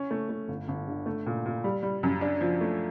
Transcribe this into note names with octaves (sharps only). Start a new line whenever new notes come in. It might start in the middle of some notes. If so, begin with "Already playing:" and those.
Already playing: C#4
A3
A3
G1
G1
D3
A3
A#2
A#2
G3
G3
F#2
D4
F3
A3